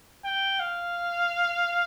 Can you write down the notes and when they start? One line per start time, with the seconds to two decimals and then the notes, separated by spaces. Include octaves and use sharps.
0.24 G5
0.60 F5